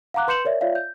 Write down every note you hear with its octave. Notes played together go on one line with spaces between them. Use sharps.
F5 F#5 A#5 D6 F#6
B4 C6 G6 C#7 E7 F#7
A#4 C#5 D5 E5
F4 C#5 D5 E5 F5
G6